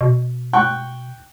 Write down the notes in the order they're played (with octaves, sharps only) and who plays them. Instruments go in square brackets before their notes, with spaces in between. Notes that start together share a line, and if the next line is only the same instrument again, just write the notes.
[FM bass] B2
[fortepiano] G5 C#6 F#6